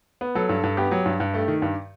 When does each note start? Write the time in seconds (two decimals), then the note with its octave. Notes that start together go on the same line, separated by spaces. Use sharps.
0.21 B3
0.35 F#3 A4
0.49 G2
0.64 G2
0.77 B3 G4
0.91 F#3
1.06 G2
1.20 G2
1.34 A3
1.48 D#3
1.62 G2